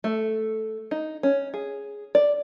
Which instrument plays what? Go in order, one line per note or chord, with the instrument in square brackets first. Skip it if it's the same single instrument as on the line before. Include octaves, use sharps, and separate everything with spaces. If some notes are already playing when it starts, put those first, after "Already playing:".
[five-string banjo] A3
D#4
C#4
G#4
D5